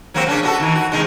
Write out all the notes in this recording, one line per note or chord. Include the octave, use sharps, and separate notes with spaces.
F#3 A#3 C4
C#3 C#4 D4
B3 F#4 A4
D#3 E3
F#4
C3 D#3 G#3